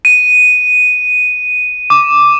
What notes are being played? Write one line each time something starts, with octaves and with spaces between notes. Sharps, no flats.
D#7
D6